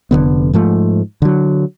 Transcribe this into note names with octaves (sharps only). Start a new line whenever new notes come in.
F1 E2 D3 B3
G#2 F3 A3
D3 F#3